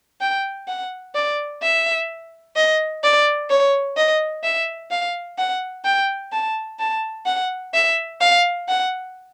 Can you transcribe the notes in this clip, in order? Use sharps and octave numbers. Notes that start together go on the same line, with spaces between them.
G5
F#5
D5
E5
D#5
D5
C#5
D#5
E5
F5
F#5
G5
A5
A5
F#5
E5
F5
F#5